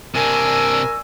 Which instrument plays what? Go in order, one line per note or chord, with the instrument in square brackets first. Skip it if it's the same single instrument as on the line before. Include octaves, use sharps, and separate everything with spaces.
[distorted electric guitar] C3 D4 [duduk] A#4 [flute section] D5 C#6 E6 [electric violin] G#5